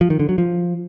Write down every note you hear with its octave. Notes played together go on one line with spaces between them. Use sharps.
F3
D#3
D3
F#3
F3